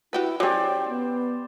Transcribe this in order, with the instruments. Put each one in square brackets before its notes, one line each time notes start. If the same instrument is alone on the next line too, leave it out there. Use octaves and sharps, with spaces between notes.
[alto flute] E4 [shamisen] F#4 G4 B4
[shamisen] F#3 C#4 [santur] G4 C5 D5 [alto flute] G5
[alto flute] B3